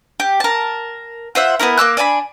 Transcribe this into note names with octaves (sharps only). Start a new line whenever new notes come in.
G4
A#4 A5
F4 C5 E5 F#5
B3 C4 E4 A#4
A#3 D6 E6 F#6
D4 G#5 A5 B5